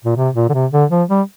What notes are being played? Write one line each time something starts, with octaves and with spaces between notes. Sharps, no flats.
A#2
C3
A#2
D3
C3
D3
F3
G3